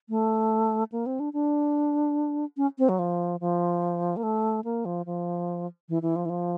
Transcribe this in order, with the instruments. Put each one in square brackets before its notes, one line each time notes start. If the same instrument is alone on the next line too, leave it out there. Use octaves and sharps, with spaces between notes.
[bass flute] A3
A#3
C4
D4
D4
C#4
C4
F#3
F3
F3
A#3
A3
A#3
F3
F3
E3
E3
F3
E3
F3